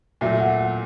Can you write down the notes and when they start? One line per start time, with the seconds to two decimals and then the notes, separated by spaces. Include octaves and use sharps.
0.21 A#2 F#3 A3 E5
0.40 F#5
0.58 F#5